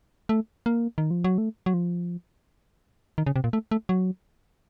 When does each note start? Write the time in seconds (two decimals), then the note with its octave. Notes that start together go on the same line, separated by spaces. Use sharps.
0.29 A3
0.66 A#3
0.98 D#3
1.11 F3
1.24 F#3
1.38 A3
1.66 F#3
1.74 F3
3.18 D#3
3.26 C#3
3.36 C3
3.44 A#2
3.53 A3
3.71 A3
3.89 F#3